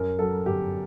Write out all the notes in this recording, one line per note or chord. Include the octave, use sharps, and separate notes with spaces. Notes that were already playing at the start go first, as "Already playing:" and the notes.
Already playing: F#2 A#4
F#3 A4
G1 G4